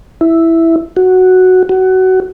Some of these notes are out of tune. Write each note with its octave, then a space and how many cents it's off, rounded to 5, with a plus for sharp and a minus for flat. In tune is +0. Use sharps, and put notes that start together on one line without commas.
E4 +0
F#4 +0
F#4 +20